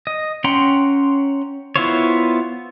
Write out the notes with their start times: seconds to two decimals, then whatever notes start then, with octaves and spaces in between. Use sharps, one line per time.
0.07 D#5
0.44 C#4 F#5 G5 A#5 C6
1.76 B3 E4 F4 C5 C#5